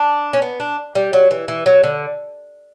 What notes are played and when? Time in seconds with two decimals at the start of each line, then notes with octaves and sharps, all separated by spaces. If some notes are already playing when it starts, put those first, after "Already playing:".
Already playing: D4
0.33 C#4
0.42 B3
0.60 D4
0.95 G3
1.13 F#3
1.31 E3
1.48 E3
1.66 F#3
1.84 D3